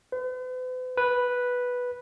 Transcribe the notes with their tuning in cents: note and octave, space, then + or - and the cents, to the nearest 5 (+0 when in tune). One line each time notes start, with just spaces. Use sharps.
B4 +45
B4 -5